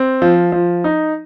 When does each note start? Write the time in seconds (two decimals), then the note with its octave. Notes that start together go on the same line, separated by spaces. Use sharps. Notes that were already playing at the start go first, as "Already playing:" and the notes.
Already playing: C4
0.22 F3
0.52 F3
0.84 D#4